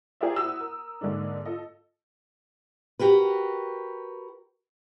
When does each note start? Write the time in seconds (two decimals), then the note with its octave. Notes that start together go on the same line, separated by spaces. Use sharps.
0.21 G4 G#4 A#4 C5 D5 E5
0.36 E4 F#4 D#6 E6
0.60 A#4
1.01 G#2 D3 G#3 A#3 D4
1.45 F4 A4 D#5
2.99 F#4 G4 A#4 B4